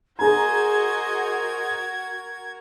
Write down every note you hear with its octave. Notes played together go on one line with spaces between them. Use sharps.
F#4 G#4 A#4 C5 D#5 A#5 G#6